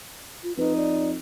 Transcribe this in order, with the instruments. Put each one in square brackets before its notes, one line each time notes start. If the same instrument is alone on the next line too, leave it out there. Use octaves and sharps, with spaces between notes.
[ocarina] F4
[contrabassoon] F2 [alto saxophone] D#4 [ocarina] B4
[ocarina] D5